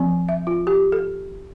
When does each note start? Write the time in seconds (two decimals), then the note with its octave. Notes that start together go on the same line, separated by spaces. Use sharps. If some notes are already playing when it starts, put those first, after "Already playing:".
Already playing: F3 C4
0.29 E5
0.47 F4
0.67 G4
0.92 A4